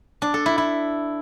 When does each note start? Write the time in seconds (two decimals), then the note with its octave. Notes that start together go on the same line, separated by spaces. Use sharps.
0.22 D4
0.34 A4
0.46 E4
0.58 E4